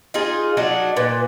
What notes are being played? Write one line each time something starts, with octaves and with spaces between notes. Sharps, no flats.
D#4 F4 G#4
F#3 D4 D#4
A#2 B4